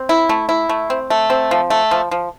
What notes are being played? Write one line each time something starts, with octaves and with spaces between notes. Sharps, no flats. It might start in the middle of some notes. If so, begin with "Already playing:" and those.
Already playing: C4
E4
A3
E4
A3
C4
A3
C4
F3
A3
F3
F3